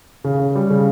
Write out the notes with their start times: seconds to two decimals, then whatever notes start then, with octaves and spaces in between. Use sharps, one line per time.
0.24 C#3
0.40 C#3
0.55 G3
0.70 C#3